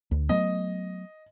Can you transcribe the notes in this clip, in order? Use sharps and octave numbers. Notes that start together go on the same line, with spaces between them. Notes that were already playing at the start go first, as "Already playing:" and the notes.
D2
F#3 A3 B3 D#5